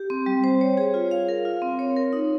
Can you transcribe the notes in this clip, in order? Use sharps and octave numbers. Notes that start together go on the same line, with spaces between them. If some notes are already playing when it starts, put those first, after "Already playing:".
Already playing: G4
C4
G3
C5
C#5
G#4
F4
F5
A#4
F4
C4
C#5
A#4
D#4